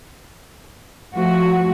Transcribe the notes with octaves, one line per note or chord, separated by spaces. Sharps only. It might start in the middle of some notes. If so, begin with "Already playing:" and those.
F3 A3 F#4